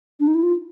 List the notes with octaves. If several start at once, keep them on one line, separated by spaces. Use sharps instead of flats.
D4
D#4
E4
F4